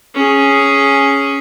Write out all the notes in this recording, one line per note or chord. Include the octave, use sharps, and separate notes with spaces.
C#4 G#4